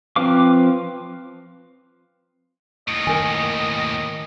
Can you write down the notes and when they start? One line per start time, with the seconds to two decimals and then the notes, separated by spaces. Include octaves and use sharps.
0.16 F3 C4 B4 F5 D6
2.88 D#2 A2 D#5
3.07 D#3 A#4 G#5